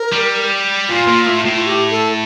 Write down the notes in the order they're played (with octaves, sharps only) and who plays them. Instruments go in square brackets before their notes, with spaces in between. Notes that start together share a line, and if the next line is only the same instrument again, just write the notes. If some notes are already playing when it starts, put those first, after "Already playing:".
Already playing: [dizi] A#4
[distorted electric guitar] G3
[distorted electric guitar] A#2 [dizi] F4
[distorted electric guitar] A#2
A2
A2
[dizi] F4
G4
A4